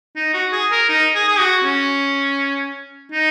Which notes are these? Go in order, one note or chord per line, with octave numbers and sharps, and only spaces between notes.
D#4
F#4
G#4
A#4
D#4
G#4
G#4
F#4
C#4
D#4